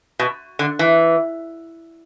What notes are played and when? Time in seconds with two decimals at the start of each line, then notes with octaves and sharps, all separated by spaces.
0.19 B2
0.59 D3
0.79 E3